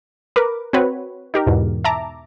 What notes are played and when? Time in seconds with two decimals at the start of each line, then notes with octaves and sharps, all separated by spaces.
0.36 A#4 B4 D6
0.73 C4 F#4 B4 C#5
1.34 D#4 G4 A#4
1.47 E2 G#2 B2
1.85 E5 A5 A#5 D6